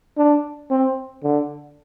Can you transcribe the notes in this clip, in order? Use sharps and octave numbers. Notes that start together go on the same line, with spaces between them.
D4
C4
D3